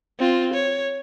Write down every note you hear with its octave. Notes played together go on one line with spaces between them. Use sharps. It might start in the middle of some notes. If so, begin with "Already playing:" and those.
C4 F4
C#5